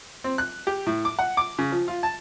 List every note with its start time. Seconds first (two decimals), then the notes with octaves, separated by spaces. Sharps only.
0.24 C4
0.38 F#6
0.67 G4
0.86 A2
1.05 D6
1.19 F#5
1.37 D6
1.58 C#3
1.72 F3
1.88 F4
2.03 A5